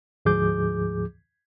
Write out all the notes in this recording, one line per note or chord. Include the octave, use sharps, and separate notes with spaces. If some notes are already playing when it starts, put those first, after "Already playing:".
D2 G#2 F3 G#4 D6 G6